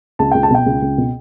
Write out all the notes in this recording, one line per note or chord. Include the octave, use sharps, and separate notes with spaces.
C#2 A5
C#2 G5
A5
B2 G5
C#2
C#2
B2